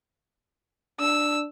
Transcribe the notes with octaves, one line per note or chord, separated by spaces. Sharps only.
D4 E6